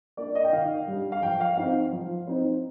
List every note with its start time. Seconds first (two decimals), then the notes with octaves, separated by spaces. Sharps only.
0.17 A#3 D4 D5
0.35 D#5
0.44 G5
0.52 D#3 F5
0.87 G3 D4
1.12 F5
1.22 F3 G5
1.40 F5
1.57 C4 D#4 F5
1.92 F3
2.27 C4 D#4